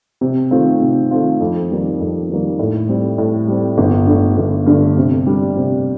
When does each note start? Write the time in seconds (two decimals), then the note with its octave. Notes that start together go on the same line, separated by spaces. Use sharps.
0.21 C3
0.51 D#3 A3 C4 F4
0.81 C3
1.11 D#3 A3 C4 F4
1.40 F2
1.70 D#3 G3 A#3
2.00 F2
2.29 D#3 G3 A#3
2.59 A2
2.89 G3 C4
3.18 A2
3.47 G3 C4
3.78 G1
4.07 G2 D3 A3
4.38 G1
4.66 G2 D3 A3
4.97 C3
5.26 G3 D4
5.56 C3